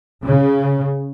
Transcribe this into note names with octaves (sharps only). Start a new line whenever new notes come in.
C#3